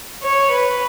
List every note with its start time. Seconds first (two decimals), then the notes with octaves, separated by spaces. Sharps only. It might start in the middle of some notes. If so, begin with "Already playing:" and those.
0.23 C#5
0.51 B4